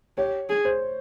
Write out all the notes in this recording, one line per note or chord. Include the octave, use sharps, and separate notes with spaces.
G4 C#5
G#4
C5